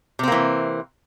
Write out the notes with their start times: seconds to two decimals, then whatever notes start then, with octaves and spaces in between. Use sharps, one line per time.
0.19 C3
0.23 C4
0.28 A#3
0.32 E3